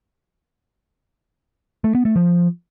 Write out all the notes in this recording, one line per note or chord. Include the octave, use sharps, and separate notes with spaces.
A3
B3
A3
F3